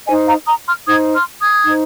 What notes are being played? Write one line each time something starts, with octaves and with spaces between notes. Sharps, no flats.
D#4 C5 D#5 G#5
F5 A#5
A#5 D#6
C6 F6
D#4 C5 D#6 G#6
C6 F6
D#6 G#6
D#4 C5